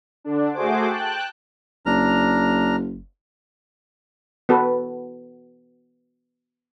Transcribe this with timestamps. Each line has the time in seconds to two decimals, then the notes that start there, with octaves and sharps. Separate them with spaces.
0.24 D3 D4
0.53 A3 F#4 G#4 C5 D6
0.88 G5 A5 F#6
1.86 F#1 D4 A#5 F6
4.49 B3 F#4 A4 B4